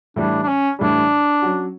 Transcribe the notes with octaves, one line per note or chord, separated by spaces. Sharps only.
A2 E3 G3 D4
D4
C#4
A2 E3 G3 D4
F#3 C#4 F#4